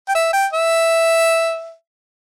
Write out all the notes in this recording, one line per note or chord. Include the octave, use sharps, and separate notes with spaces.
G5
E5
G5
E5